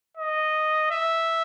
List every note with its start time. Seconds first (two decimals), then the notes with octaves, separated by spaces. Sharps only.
0.17 D#5
0.90 E5